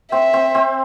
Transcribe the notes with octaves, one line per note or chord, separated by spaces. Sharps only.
C4 E5
C4
C4